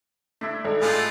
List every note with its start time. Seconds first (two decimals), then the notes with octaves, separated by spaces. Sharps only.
0.41 A3 D4 E4 E5
0.64 G#1 D4 A4 D5
0.81 A2 G#3 A3 C4 F4 G#4 C5